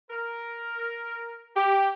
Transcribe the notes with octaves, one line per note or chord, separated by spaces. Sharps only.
A#4
G4